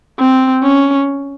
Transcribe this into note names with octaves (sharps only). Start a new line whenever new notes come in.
C4
C#4